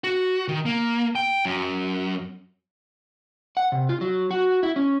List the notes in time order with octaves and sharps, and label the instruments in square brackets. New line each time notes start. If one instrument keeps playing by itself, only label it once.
[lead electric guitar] F#4
D#3
A#3
G5
F#2
[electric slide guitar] F#5
C3
F4
F#3
F#4
E4
C#4